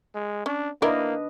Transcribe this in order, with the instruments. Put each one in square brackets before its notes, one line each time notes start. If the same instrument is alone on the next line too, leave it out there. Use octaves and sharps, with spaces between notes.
[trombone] G#3
[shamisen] C#4 [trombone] D4
[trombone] A#3 [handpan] D4 B4 D#5 [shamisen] E4 A#4 D5